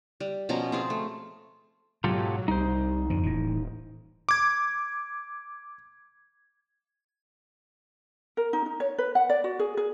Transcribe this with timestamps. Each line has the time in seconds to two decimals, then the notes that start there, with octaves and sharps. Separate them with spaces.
0.20 G3
0.49 B2 F3 C#4 A#5
0.72 C4 F4 G#4
0.90 A3
2.04 G#2 B2 F#3 F4 G4 A4
2.48 C2 G3 D#4 C5
3.10 F2 G#2 D3
3.23 D#1 A2 E3
4.29 D6 G#6
8.37 A#4
8.53 D#4
8.66 D#4
8.80 C#5
8.98 B4
9.15 F#5
9.30 D5
9.44 F#4
9.59 G#4
9.77 G#4